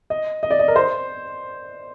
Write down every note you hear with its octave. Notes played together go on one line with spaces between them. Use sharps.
D#5
D#5
D5
D#5
A#4
C5